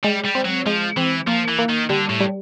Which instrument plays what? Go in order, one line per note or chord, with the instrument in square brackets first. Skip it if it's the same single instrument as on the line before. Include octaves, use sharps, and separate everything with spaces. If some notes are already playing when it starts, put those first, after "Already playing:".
[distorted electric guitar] G3 [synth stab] G#3
[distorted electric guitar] G3
[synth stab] C4
[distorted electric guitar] F#3
[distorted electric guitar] F3 [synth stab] G#3
[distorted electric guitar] E3 [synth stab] C4
[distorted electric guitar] F3 [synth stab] A#3
[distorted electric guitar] E3
[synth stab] A#3
[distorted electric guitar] D#3
[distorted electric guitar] D3 [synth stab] G3
[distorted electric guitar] A2
[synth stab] G3